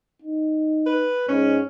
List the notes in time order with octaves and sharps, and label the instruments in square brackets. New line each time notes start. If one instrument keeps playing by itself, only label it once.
[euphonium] D#4
[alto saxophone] B4
[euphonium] G#2 [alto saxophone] C#4